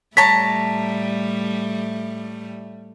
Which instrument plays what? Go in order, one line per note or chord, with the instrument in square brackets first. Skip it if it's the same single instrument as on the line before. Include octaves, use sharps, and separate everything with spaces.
[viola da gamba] A2 G3 A3 [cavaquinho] C#5 A5 A#5 [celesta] B6